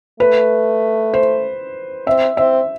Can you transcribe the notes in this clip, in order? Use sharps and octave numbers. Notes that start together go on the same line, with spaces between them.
A3 B4
C5
C4 E5
C4 E5